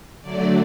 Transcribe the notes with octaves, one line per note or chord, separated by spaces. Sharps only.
D3 F#3 A3 D5